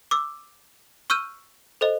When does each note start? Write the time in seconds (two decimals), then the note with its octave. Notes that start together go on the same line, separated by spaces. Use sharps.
0.11 D6 E6
1.10 C#6 E6 F6 G6 D#7
1.81 A4 C5 D#5